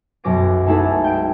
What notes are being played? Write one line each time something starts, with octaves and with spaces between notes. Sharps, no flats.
B1 F#2 D6 A#6 D7
G#3 A3 D#4 E4 G#4 A4
G5 D7